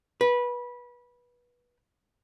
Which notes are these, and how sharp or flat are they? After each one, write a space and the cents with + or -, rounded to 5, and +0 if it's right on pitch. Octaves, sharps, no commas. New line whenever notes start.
B4 -20